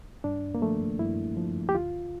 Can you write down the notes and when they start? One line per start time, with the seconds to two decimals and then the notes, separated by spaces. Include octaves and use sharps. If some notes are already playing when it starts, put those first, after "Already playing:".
0.24 G2 D4
0.55 A#3
0.62 F3 A3
0.99 G2 E4
1.37 F3
1.69 G4
1.75 D2 F4